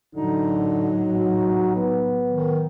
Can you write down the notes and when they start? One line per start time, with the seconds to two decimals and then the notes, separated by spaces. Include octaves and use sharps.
0.15 A2 D3 F#3 D#4
1.12 F#4
1.76 B3
2.32 D#3